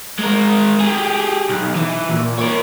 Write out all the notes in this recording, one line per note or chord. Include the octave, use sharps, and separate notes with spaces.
G#3 A#4
G4 G#4
B1
E3
A#2
A#4 C#5